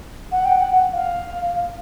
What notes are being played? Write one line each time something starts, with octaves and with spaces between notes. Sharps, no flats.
F#5
G5
F#5
F5